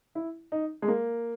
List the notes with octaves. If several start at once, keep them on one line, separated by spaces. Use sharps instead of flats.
E4
D#4
G#3
A#3